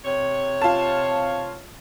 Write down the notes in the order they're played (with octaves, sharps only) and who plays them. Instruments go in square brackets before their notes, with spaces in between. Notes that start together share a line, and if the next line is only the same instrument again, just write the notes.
[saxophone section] C3 C#5
[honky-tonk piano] F4 A5